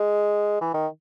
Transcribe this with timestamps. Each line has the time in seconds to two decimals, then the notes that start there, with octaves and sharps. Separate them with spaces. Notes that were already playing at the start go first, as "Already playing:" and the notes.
Already playing: G#3
0.61 E3
0.74 D#3